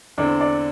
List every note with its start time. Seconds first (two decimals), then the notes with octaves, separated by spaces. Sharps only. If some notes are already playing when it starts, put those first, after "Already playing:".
0.18 E2 D3 C4 D5
0.41 D5